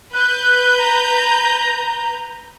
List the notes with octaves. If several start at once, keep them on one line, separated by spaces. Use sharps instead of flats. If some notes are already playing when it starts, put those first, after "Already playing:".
B4 F#6 G6
A#5